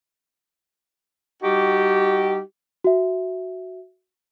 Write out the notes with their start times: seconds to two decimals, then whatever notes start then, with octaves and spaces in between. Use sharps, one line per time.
1.43 G3 D#4 F#4 G4
2.84 F#4 E5